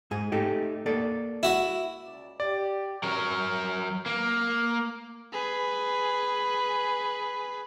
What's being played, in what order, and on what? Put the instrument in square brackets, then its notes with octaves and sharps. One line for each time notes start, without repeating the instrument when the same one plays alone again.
[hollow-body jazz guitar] G#2 G#4
A3 D#4 G4
A#3 A4 D5
[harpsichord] E4 F#4
[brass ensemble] C#2 D5
[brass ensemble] G4 [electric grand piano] D5
[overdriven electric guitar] F#3 A#4
A#3
[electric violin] G#4 B4